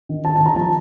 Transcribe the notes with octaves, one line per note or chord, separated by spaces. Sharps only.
D#3
D#3 A5
A5
D#3
A#5
F3 A5